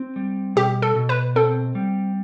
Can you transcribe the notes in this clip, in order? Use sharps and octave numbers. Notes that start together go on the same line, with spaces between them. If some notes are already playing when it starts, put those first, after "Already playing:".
Already playing: C4
G3
B2 G4
A4
B2
B4
C4 A4
G3